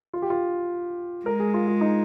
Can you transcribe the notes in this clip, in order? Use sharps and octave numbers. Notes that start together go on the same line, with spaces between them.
F4
G4
F4
G#3 A#4
G#4
F4
F4
D#4